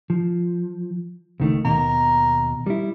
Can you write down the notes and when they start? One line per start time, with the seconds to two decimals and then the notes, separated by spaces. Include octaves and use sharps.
0.10 F3
1.40 C#2 D#3 A3
1.65 D#2 B2 A#4
2.67 G3 E4